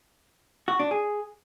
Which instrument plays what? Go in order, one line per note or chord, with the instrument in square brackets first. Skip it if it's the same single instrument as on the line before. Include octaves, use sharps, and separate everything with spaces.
[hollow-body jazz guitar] F#4
D4
G#4